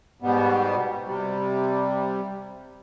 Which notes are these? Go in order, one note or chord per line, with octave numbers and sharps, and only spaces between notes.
G#2 B2 G3 B3
C3 G3